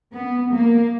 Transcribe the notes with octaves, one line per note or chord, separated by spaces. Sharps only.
B3
A#3